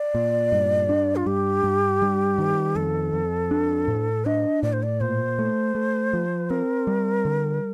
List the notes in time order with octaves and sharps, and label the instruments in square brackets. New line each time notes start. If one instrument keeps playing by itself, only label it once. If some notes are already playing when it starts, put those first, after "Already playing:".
Already playing: [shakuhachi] D5
[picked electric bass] A#2
G2
D4
[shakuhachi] F4
[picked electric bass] G2 [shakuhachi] G4
[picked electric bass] G2
G3
D#3
[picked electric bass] F2 [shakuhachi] A4
[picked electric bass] F2
D4
A2
[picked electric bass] D4 [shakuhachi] D#5
[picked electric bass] A2 [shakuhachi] D5
[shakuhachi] C5
D5
[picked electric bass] A#2 [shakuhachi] C5
[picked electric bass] A3
A3
F3
[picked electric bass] C4 [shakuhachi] A#4
[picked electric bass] G3
D3